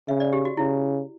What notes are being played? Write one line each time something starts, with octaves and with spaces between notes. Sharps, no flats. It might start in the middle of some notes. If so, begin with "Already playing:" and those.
C#3 E5
D5
G4
F#4
C#3 E4